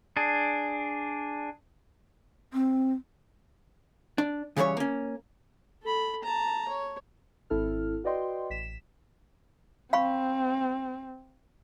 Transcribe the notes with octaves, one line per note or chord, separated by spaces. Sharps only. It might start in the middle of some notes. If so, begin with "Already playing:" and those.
D4 G#4
C4
D4
C#3 E3 G3 C5 C#5
A#3 C#4
A4 B5
A5 A#5
C#5
G#1 C4 E4 A4 F6
F#4 B4 D5 D#5 G5 C6
A1 B6 E7
C4 F5 B5 C#6